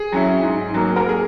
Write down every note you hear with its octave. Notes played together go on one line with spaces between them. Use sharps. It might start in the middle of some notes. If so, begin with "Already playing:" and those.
Already playing: G#4
F#3 C#4 E4
G#2
F#3 A#3
A#4
G#4